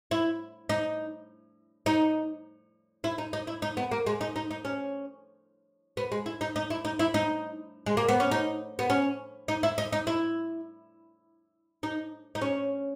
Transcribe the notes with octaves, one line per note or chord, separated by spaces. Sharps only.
E4
D#4
D#4
E4
D#4
D#4
E4
D#4
B3
A#3
G#3
D#4
D#4
D#4
C#4
B3
G#3
E4
D#4
D#4
E4
D#4
E4
D#4
G#3
A#3
B3
C#4
D#4
B3
C#4
D#4
E4
D#4
D#4
E4
D#4
D#4
C#4